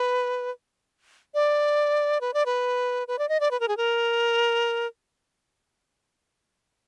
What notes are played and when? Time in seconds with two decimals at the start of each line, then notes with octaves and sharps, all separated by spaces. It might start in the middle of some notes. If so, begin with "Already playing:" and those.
Already playing: B4
1.34 D5
2.21 B4
2.34 D5
2.46 B4
3.08 B4
3.19 D5
3.29 D#5
3.40 D5
3.51 B4
3.60 A#4
3.68 G#4
3.77 A#4